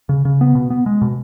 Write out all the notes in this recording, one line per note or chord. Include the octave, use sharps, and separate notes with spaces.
C#3
C#3
B3
B2
B3
G#3
B2